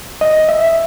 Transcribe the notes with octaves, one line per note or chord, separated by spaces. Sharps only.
D#5
E5